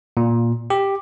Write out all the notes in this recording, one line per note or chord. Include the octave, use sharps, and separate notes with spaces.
A#2
G4